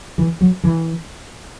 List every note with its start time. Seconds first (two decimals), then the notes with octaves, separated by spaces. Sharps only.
0.18 E3
0.41 F#3
0.64 E3